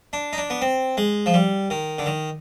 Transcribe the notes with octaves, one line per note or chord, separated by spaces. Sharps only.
D4
D#4
D4
B3
C4
G#3
F3
G3
D#3
D3
D#3